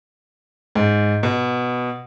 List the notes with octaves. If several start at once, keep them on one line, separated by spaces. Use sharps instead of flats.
G#2
B2